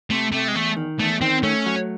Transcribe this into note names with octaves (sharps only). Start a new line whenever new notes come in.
C3 A3
C3 A3
G#3
E2 A3
D#3
E2 A3
D#3 C4
A3 C#4
F#3